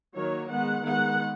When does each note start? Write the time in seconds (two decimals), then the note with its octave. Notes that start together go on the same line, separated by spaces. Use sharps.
0.15 D#3 F#3 A#3 C#5
0.49 D#3 G#3 B3 F#5
0.83 D#3 G#3 B3 F#5